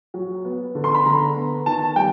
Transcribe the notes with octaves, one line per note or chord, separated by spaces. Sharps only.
F#3
B3
D3
C6
B5
D3 A#5
B3
D#3 A5
G3 G5